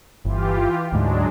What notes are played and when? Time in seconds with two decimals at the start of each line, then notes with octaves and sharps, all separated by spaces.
0.25 G1 E3 F4 G4
0.92 D2 G#2 F#3 G#3 D4